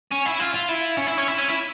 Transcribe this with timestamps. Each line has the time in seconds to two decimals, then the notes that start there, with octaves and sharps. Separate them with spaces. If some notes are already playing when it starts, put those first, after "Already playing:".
0.12 C#4
0.26 E4
0.40 F4
0.54 F4
0.69 E4
0.97 C#4
1.07 E4
1.18 C#4
1.28 E4
1.38 C#4
1.48 E4